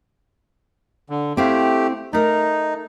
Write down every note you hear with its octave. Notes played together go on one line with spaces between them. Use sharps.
D3
A3 C4 E4 G4 F5
A3 D#4 A#4